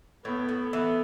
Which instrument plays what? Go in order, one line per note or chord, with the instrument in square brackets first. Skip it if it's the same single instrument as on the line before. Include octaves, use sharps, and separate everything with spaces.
[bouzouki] A2 [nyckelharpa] B3
[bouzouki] A2
[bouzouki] E3 [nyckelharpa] B3